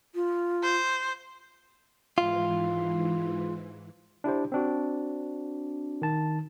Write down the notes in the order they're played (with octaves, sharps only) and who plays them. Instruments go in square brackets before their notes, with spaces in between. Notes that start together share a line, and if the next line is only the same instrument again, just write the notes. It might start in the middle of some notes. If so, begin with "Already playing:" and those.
[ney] F4
[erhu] C5
[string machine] G#2 E3 [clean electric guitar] F4
[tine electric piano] D4 E4 G4 C5
C4 D4 F#4
D#3 A5